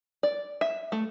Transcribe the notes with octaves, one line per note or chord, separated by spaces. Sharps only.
D5
E5
A3